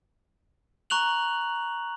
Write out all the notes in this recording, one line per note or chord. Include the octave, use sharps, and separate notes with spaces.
A#5 C#6 F#6 F7 F#7